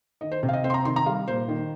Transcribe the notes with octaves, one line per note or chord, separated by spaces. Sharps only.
D#3 D#5
C5
C3
F5
D#5
C4 C5
C6
A#5
D#3 C6
A#5
G3 F5
A#2 C5
D#3